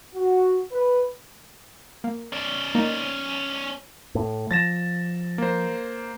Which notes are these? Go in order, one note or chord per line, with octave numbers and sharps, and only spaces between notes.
F#4
B4
A#3
C#4 D5
A#3 D#4
A2
F3 A6 A#6 E7
A#3 C5